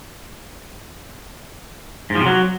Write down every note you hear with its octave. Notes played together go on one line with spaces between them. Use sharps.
G#2
F3
C3
F#3